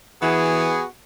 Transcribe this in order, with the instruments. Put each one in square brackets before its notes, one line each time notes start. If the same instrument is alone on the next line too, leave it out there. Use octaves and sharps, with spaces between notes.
[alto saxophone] E3 [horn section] B3 F#4 G#4